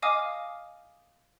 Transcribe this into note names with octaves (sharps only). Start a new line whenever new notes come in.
D#5 F5 G#5 D6 D#6 F6